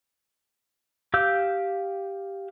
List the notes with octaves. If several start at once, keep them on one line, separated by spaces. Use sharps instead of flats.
G4 F5 E6 G6